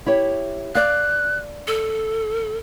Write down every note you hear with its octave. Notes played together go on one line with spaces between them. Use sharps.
E4 G4 C#5
D5 F5 F#6
A4